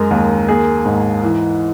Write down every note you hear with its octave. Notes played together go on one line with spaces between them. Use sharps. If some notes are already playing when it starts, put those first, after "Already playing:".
Already playing: F#2 G#3 A#4
D#2
A#3 G#4
G#2
E3